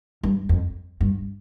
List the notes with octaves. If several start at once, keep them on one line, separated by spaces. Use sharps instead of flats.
G2
F2
G2